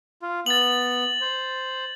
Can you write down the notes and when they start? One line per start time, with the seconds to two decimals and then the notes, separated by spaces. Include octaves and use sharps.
0.22 F4
0.46 B3 A6 F#7
1.21 C5